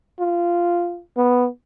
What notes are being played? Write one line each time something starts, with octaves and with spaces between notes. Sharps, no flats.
F4
B3